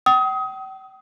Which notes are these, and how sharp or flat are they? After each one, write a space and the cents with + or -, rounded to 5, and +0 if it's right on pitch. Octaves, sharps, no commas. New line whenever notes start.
G5 -40 D#6 +25